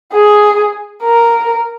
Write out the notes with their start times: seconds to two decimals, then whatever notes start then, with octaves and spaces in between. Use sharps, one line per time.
0.13 G#4
1.03 A#4